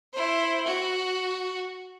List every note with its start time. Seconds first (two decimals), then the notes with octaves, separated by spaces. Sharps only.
0.13 E4 C5
0.66 F#4